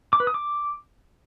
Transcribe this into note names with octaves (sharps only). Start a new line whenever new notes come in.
D6
B4
D#6
D6